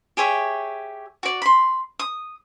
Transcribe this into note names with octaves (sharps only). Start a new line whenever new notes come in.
G4 G#4 C#5 E5
F#4 D5
B5 C6
D#6